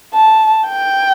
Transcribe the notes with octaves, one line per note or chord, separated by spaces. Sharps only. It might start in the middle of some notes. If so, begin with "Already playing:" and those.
A5
G5